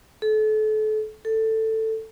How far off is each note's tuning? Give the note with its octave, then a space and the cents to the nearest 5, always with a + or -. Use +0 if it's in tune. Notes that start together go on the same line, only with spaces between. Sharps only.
A4 -35
A4 +10